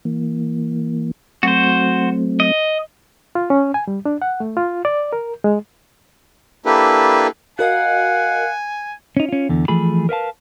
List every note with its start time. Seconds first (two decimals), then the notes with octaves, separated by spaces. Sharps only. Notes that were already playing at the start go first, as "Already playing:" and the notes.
0.05 E3 A#3
1.43 F#3 A3 C4 F#4 C5
2.40 D#5
3.35 F4
3.50 C#4
3.74 G#5
3.88 G3
4.05 D4
4.22 F#5
4.40 A3
4.57 F4
4.85 D5
5.13 A#4
5.44 G#3
6.66 A#3 D4 E4 G4 A4 B4
7.59 F#4 A#4 D#5 F5 F#5 G#5
9.17 C#4 D#4
9.29 C#4 F4
9.49 E2 D3
9.68 E3 F3 A3 G#4 B5
10.09 A#4 B4 F5 A5